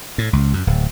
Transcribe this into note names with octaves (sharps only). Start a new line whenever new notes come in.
A2
C#2
F#2
D1